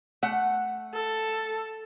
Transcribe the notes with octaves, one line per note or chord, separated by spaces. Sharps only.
A3 F#5
A4